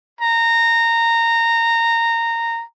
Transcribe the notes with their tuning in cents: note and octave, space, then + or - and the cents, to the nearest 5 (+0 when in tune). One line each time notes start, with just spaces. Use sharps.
A#5 -15